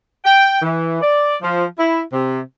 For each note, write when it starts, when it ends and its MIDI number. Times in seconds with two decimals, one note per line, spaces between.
0.25 0.60 79
0.62 0.98 52
1.02 1.36 74
1.42 1.64 53
1.78 2.01 64
2.13 2.39 48